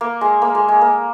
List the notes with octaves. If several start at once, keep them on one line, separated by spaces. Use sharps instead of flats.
A#3
G#3
A#3
G#3
G#3
A#3